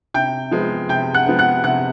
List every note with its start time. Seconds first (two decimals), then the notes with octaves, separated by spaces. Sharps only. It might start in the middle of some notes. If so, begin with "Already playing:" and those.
0.14 C3 G5 G6
0.51 F3 G#3 B3
0.89 C3 G5 G6
1.14 F#5 F#6
1.26 F3 G#3 B3
1.39 F#5 F#6
1.64 C3 F#5 F#6